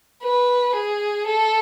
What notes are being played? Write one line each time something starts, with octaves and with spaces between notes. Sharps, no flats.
B4
G#4
A4